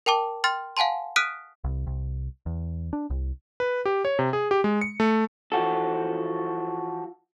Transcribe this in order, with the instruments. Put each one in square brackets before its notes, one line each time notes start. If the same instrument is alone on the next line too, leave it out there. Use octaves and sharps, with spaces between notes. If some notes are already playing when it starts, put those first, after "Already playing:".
[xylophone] A#4 G5 A5 D6
G5 C6 F6 A6
F5 F#5 G#5 A5 C6
D#6 F6 F#6 B6 D7 D#7
[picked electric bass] C2
C2
E2
D4
C2
[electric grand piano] B4
G4
C#5
C3
G#4
G4
G#3
C#7
A3
[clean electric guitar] E3 F3 F#4 A4